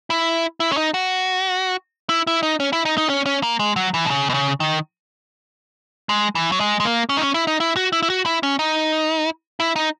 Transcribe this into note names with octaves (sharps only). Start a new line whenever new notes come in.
E4
E4
C#4
D#4
F#4
E4
E4
D#4
C#4
E4
D#4
D#4
C#4
C#4
A#3
G#3
F#3
E3
B2
C#3
B2
C#3
D#3
G#3
E3
F#3
G#3
G#3
A#3
C#4
D#4
C#4
E4
D#4
E4
F#4
E4
E4
F#4
E4
C#4
D#4
E4
D#4